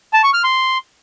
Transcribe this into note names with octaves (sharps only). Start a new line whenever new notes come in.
A5
C#6
F6
C6